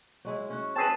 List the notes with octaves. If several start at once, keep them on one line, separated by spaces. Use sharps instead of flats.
F#3 G#3 E4
C#4 F#4
C4 G#4 B4 A5